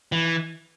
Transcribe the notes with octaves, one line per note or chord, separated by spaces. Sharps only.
E3